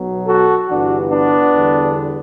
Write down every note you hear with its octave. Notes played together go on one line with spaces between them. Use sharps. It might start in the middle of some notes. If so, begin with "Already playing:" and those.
Already playing: B1 B2 F#3
F#4 A4
G1 G2 E3 D4 F#4
B3 D4
E2 D3 G3